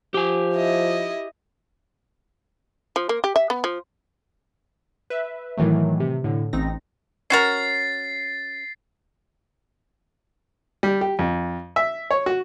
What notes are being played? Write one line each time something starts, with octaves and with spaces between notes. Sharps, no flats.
F3 G4 G#5
E4 D#5
F3
A#3
G4
E5
B3
F3
B4 E5
A2 D#3 E3 F#3 A3
C3
A2 D3
A1 C4 D#4 A#6
C#4 F#4 A#4 A6 C7
G3
G4
F2
E5
C#5
F#4